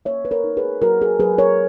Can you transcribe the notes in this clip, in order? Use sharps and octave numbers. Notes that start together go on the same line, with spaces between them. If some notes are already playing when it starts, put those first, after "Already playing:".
A#3 C#5 E5
B4
A#4 C#5
D#4
G#4 B4
F#3 F#4 A#4
G#4
F#3 G#4 B4
A#4 C#5